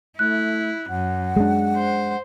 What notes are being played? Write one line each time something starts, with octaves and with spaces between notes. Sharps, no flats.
A3 E4 F#6
F#2 F#5
G#3 D4
C5